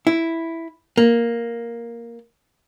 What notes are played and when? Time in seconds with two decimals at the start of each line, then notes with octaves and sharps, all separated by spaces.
0.07 E4
0.98 A#3